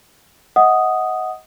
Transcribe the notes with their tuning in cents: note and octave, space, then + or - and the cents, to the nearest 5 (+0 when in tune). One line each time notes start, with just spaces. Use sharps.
D#5 +25 F#5 +0 D#6 +0